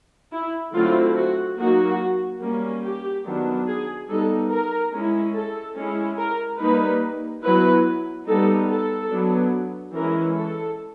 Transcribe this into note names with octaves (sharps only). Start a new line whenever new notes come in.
E4
D3 F#3 A3 C4 E4 F4
F#4
F#3 A#3 D#4 F#4
G3 A#3 C#4
G4
D#3 F#3 B3 D4
G#4
G3 B3 D#4 A4
A#4
G#3 C#4 E4
A4
G#3 C#4 E4
A#4
G3 A#3 D#4 B4
F#3 B3 E4 B4
G3 B3 D#4 A4
A4
F#3 B3 D4
E3 G#3 C#4 E4 A#4
A4